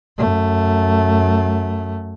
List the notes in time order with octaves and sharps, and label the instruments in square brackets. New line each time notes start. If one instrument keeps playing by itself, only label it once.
[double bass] F#2 A3